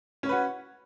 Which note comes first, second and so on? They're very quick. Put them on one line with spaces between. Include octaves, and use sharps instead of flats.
C#4 C#5 B4 F#4